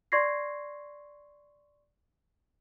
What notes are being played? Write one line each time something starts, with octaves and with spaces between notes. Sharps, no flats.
D5 C6 C#6 G#6 A#6 C7